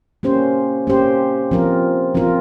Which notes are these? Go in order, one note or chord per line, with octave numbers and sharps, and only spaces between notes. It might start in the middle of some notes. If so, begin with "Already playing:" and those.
A#3 C#4 G4 C5
A#3 C#4 G4 C5
F3 C4 F4 A#4
F3 C4 F4 A#4